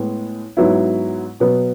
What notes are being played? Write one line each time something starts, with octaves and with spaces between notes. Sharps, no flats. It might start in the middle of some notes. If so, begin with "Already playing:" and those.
Already playing: A2 G#3 B3
G#2 F#3 B3 E4
B2 F#3 B3